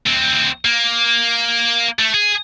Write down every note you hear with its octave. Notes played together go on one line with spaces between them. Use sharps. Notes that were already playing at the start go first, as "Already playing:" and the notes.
D2 C4
A#3
A3
G#4